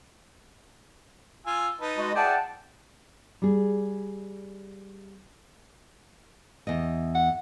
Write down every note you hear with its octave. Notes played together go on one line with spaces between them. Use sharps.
F4 G#5 E6
D#4 B4 A5
G#3 F#4 D#5
E4 G#4 D5 F#5 G5 A5
G3 G#4
E2 D#5
F#5